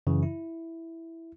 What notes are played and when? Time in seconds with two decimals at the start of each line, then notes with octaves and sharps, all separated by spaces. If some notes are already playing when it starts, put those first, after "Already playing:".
0.07 F#2 C#3 E3
0.23 E4